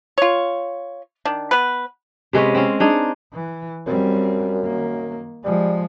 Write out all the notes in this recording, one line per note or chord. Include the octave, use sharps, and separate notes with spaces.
F4 C#5
D#3 D4
B3 B4
C3 G#3 B3 C#4
C4 C#4
D4 D#4 G#4
E3
F#2 G3 C4
D#3 A#3
F3 G3 G#3